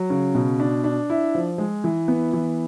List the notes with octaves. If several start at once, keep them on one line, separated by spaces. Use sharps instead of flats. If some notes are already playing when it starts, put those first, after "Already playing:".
Already playing: F#3
C#3
B2
D4
D4
E4
F3
G#3
E3
B3
E3